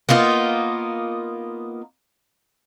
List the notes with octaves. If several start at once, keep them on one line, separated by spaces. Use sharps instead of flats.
A#3 B3 D#4 F4